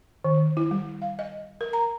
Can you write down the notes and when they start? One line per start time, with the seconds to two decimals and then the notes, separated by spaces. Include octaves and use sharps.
0.24 D#3
0.57 E4
0.71 G3
1.02 F5
1.19 D#5
1.61 A#4
1.73 A#5